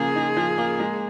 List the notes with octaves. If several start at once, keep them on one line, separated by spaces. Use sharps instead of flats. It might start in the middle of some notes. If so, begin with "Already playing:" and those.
Already playing: C#3 F3 A#3 G#4
D#4
F3
A#3
G#3